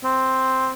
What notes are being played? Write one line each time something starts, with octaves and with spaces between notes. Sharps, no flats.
C4